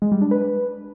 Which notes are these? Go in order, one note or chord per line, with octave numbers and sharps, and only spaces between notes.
G#3
G3
D4
B4